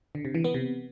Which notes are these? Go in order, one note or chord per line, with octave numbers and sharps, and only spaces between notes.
D3
C3
E3
B3
C3